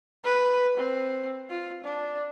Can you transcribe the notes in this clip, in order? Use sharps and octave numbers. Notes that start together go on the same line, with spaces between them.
B4
C4
F4
D4